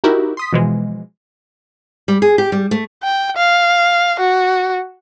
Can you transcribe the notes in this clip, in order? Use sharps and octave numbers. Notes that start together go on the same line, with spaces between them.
D#4 E4 F#4 G4 A#4
C6 D#6 B6
B2 E3 F3 G#3
G3
G#4
G4
G3
A3
G5
F5
F#4